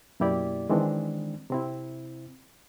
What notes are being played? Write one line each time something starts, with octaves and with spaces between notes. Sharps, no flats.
F#2 B2 A#3 E4 G4 D5
D#3 E3 G#3 C4 D4
C3 C4 E4